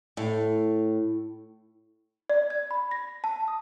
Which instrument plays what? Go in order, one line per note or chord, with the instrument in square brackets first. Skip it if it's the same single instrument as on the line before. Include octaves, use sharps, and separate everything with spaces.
[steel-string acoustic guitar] A2
[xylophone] D5
G#6
B5
A#6
A5
D#6